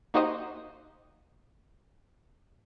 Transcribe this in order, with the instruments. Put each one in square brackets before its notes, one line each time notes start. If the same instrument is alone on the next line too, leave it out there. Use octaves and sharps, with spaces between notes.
[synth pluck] A#3 D#4 F#4 G4 C5 D#5